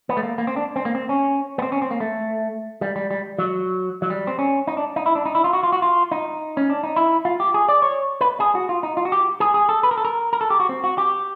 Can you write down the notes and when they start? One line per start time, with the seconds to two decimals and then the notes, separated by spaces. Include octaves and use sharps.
0.09 B3
0.17 A3
0.23 A#3
0.38 A#3
0.47 C4
0.56 D4
0.76 C4
0.85 A#3
0.95 C4
1.09 C#4
1.58 B3
1.62 C4
1.72 C#4
1.82 C4
1.91 A#3
2.00 A3
2.81 G3
2.96 G3
3.11 G3
3.38 F#3
4.02 F#3
4.10 G3
4.27 C4
4.39 C#4
4.67 D#4
4.77 D4
4.96 D#4
5.06 E4
5.15 D4
5.26 D#4
5.35 E4
5.44 F4
5.53 F#4
5.63 F4
5.72 F#4
5.82 F4
6.11 D#4
6.57 C#4
6.70 D4
6.83 D#4
6.96 E4
7.25 F4
7.40 G4
7.54 G#4
7.69 D5
7.82 C#5
8.21 B4
8.40 G#4
8.55 F#4
8.69 F4
8.83 D#4
8.97 F4
9.05 F#4
9.12 G4
9.40 G#4
9.54 G#4
9.69 A4
9.83 B4
9.91 A#4
9.98 A4
10.05 A#4
10.33 A#4
10.41 A4
10.50 G4
10.60 F#4
10.69 C4
10.84 F#4
10.98 G4